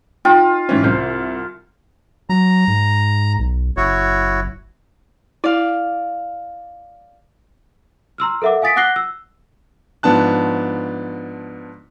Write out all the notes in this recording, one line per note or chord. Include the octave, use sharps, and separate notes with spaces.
D#4 F4 G5
G#2 E3 C#4
C2 C5
F#3 A#5
G#2
B1
F#1 E4 F#4 C#5
E4 D5 F5
A#5 C6 E6 F6
A4 A#4 E5 F#5 D6
F5 G#5 D#6 A6 B6 D7
F#5 D6 F#6 A#6 C7 G7
E6
G#2 F3 B3 D4 A5 F#6